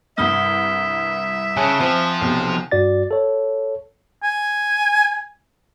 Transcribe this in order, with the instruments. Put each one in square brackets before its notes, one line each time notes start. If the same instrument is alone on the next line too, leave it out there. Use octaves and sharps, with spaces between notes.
[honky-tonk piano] C2 G2 [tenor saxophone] E5 [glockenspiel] D#6 F6 G7
[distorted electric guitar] C#3 [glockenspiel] G#5 A5 F#6
[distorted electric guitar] F3 [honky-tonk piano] C4
[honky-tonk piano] B1 C3
[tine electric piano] G2 F#4 D5 A6
A4 C#5
[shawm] G#5